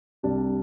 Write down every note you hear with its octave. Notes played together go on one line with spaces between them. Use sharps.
C2 C3 G3 D4